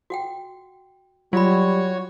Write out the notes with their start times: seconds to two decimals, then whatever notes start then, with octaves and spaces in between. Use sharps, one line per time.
0.10 F#4 F#5 G5
1.33 F#3 G3 F4 F#4 C#5 B5